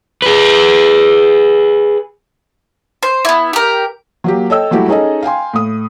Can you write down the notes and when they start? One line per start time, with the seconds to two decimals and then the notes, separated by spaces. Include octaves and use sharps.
0.22 G#4 B4
3.03 C5
3.25 B3 E4
3.53 G4 A#4
4.24 F#3 A#3 G4
4.50 A4 C#5 D#5 G5 E6
4.71 F#3 G3 A3 E4 F#4 G4
4.88 C#4 D#4 G#4 A4 D#5
5.23 F5 G5 G#5 C6
5.53 A2 D#6